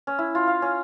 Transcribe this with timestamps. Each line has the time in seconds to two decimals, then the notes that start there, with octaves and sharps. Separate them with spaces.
0.07 C#4
0.19 E4
0.35 F4
0.47 F5
0.62 C#4